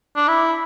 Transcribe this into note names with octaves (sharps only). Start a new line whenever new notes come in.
D4
E4